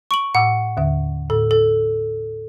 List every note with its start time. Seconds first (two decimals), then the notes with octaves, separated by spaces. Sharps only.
0.11 C#6 D7 F#7
0.35 A2 F#5 D6 E6
0.77 D#2 D3 E5
1.30 A2 A4
1.51 A4